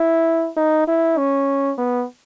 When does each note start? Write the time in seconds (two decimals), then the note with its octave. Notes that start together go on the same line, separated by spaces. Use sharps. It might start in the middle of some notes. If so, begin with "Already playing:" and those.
Already playing: E4
0.56 D#4
0.87 E4
1.18 C#4
1.78 B3